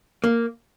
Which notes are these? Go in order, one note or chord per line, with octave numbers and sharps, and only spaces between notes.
A#3